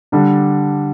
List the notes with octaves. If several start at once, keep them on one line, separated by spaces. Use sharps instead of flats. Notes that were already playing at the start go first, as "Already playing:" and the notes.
D3 G3 D4